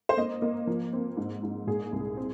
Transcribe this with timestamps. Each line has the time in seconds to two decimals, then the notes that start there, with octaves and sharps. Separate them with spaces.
0.09 C5
0.17 A#3 D#5
0.42 A#3
0.67 F3
0.93 C4
1.17 G#2
1.43 G#2
1.67 A#2 G#4
1.92 C2
2.17 C4